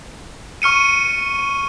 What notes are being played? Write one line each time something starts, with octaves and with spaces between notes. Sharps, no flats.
C#6 F6 C#7 D#7